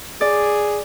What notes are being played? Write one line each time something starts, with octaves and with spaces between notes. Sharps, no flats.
G#4 D5